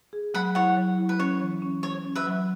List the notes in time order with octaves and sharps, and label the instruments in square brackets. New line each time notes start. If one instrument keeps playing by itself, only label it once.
[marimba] G#4
[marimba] F#3 [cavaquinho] F#5 B5
[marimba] E4 [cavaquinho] C#5 F#5
[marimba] F#3
E4
[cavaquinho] B4
[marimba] C#4 [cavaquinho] C#5
[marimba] E3
C#4
[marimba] C#4 [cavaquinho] C#5
[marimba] C#4
[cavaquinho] B4 E5
[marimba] F#3